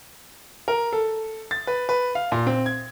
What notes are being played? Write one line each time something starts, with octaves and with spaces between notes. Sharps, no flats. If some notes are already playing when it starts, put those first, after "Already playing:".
A#4
A4
A6
B4
B4
F5
A#2
C4
G#6